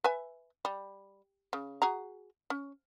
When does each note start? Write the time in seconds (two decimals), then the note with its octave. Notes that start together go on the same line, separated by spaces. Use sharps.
0.04 B4 E5 G#5
0.65 G3
1.53 C#3
1.82 F#4 G#4 A#5
2.50 C#4